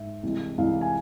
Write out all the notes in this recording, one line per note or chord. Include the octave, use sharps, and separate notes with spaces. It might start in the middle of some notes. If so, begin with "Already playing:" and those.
Already playing: G#2 E5
C2 C3 E3 G#3
C2 C3 E3 G#3 F5
G#5